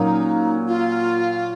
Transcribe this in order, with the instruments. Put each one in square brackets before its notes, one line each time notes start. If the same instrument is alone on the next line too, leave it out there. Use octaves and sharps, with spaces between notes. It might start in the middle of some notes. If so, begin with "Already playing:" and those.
Already playing: [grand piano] A#2 F#3 A#3 C#4 [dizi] D#4
[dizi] F4